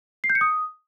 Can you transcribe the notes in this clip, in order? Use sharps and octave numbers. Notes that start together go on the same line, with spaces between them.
C7
G6
C#7
D#6